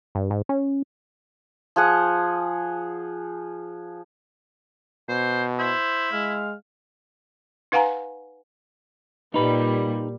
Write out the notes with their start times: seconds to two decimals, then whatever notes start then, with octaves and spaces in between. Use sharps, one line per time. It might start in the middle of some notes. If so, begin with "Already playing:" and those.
0.15 G2
0.30 G#2
0.49 C#4
1.76 F3 G#4 F#5
5.09 B2 C5
5.59 E4 C5
6.12 G#3 F5
7.72 D#4 B4 F5 F#5 G#5 A#5
9.34 A#2 G3 D#4 B4